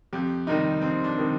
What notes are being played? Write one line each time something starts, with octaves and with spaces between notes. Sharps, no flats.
F2 G4
C3 D#3 G3 D#4
F2 C4
D4
C3 D#3 G3